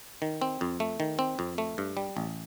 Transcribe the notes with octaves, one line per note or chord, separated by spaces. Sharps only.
D#3
C4
F2
A3
D#3
C4
F2
A3
G2
G3
A1